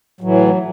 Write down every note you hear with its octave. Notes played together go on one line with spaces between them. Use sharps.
A2 E3 F#3